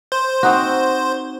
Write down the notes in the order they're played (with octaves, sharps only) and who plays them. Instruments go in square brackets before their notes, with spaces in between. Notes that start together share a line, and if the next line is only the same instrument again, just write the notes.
[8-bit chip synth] C5
[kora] C4 D#4 F#4